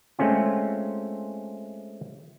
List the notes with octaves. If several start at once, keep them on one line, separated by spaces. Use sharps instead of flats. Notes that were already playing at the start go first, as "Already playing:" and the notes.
G#3 A3 C4 C#4 F4